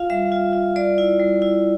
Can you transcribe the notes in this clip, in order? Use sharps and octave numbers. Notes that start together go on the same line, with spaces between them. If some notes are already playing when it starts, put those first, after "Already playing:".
Already playing: F4 F5
G3 E5
F4
F4
G3 D5
E4
G3
E4